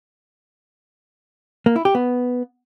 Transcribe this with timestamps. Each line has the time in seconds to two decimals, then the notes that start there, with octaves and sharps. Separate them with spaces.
1.66 A#3
1.76 E4
1.85 G4
1.95 B3